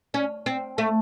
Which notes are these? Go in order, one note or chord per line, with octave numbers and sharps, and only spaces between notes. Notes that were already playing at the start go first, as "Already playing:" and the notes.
C#4
C4
A3